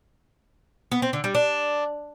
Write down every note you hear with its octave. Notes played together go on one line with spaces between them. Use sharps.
B3
C4
D3
G3
D4